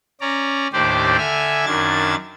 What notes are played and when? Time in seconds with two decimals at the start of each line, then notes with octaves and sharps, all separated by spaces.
0.21 C#4 D5 A#5
0.73 D#2 A2 D4 G4 C5 D5
1.18 D3 E5 G#5 F6
1.66 F#2 D#3 D4 G#6 A6